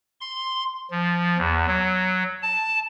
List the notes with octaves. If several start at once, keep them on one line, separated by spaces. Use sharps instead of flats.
C6
F3
E2
F#3
A5